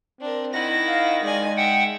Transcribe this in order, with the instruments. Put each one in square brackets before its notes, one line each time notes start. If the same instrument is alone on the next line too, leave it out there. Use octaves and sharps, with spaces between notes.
[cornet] C4 [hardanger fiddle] D4 A#4
[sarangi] D#3 [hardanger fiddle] E4 F#5 [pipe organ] A#6
[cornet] F5
[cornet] G#3 [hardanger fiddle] D5 G#5
[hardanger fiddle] E5 [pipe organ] F#5 G5